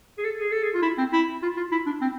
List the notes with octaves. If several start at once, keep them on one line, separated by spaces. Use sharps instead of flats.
G#4
A4
G#4
A4
G#4
F4
E4
C4
E4
F4
F4
E4
D4
C4